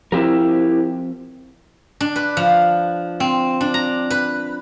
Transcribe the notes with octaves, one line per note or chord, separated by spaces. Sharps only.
F3 C4 E4 G4 A#4
D4
B4
F3
C4
D4
A#5
B4